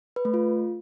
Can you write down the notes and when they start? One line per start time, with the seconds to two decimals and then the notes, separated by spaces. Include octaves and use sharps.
0.16 B4
0.25 A3
0.34 F4